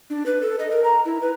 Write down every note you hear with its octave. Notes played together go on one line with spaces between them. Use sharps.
D4
B4
A4
D#5
A#4
A#5
E4
B4